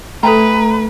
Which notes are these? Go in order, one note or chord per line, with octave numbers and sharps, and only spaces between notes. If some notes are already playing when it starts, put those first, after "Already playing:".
A3 A4 B4 G5 A#5